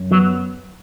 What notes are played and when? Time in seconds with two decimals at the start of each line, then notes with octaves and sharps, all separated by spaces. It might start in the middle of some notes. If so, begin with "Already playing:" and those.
Already playing: F#2
0.11 F#3 B3